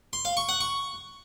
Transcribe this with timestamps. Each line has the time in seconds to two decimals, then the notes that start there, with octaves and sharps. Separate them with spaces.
0.13 C6
0.25 F5
0.37 C#6
0.49 F#5
0.61 C#6